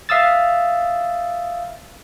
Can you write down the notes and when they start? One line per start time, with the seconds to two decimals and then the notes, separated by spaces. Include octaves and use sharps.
0.09 E5 F5 D#6 E6 A6